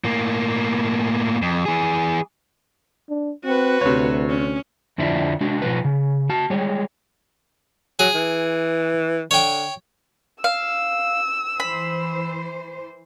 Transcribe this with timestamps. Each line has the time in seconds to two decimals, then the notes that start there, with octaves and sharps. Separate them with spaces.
0.04 A2 A#3
1.42 F2
1.66 E3 G#4
3.09 D4
3.45 C4 F#4 B4
3.81 D2 C3 C#5
4.29 C#4
4.98 F2 D3 F3 D4 E4
5.41 G#3 D4 F#4
5.62 B2 D#3 F3 B4
5.85 C#3
6.29 F#4 A5
6.50 G3 G#3 C#5
7.99 F#3 G#4
8.14 E3
9.31 D3 C#5 G5
10.44 F5 E6
11.60 E3 C5 B5